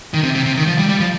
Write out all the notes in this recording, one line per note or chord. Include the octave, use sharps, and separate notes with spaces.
D#3
C3
C3
C3
D#3
F3
G3
G3
F3